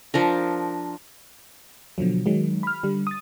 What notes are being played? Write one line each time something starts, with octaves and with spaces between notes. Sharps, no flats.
F3 D4 A#4
B2 D3 F3 F#3
D#3 F#3 G#3
B5 F6
D3 G3
D#6 A6